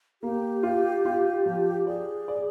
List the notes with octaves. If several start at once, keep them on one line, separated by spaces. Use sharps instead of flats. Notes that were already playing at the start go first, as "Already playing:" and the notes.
A#3 G4
F4
F4
F3
G#4 D5
D5